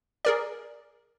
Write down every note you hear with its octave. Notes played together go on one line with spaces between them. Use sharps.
G#4 A#4 D5